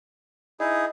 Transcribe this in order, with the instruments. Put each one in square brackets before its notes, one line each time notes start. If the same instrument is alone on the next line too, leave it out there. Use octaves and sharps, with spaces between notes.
[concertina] D#4 E4 G#4 [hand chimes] D#5